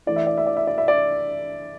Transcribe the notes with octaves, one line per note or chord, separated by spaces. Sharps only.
E3 A3 E4 D5
E5
D5
E5
D5
E5
D5
E5
D5